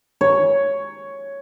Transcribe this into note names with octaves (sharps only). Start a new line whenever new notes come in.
C#5